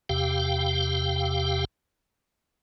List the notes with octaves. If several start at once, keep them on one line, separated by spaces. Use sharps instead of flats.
E2 C3 G4 F5 G5